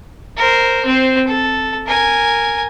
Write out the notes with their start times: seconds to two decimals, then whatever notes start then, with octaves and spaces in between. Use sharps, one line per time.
0.37 A#4 C5
0.86 C4 C5
1.28 A4
1.87 A#4 G#5